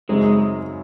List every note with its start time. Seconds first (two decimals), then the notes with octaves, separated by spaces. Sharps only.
0.09 F#2 C#3 F#3 G#3 C4 D#4